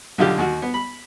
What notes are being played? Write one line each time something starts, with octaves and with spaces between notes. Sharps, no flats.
B1 D3 F4 G4
D#2 F#4
B3
B5